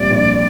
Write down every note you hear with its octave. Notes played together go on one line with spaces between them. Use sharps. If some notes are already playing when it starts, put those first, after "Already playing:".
Already playing: A#1 A#2 G3 C4 D5
A#1